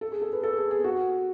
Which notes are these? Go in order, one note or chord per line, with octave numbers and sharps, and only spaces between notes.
A4
G#4
A4
B4
A4
G#4
G#4
F#4